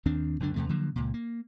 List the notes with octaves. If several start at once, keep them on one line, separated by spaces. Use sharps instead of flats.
D#2 D#3 C4 D4
C#2 F#2 D3 D4
E2 C3 A3
D3 F3 F#3 A#3
C#2 A#2
A#3